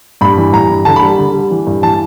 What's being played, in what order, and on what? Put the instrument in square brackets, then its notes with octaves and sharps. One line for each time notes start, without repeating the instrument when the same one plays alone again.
[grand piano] G2 B5
E3
G2 A#5
E3
D3 A5
B5
G3
D3
G3
E3
G2
E3 A5